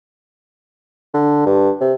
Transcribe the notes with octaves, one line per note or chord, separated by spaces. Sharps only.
D3
G2
C3